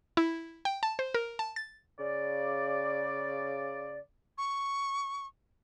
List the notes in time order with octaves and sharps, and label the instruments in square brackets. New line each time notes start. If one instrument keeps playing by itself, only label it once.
[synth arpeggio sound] E4
G5
A5
C5
A#4
A5
A6
[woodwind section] C#3 D5
[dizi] C#6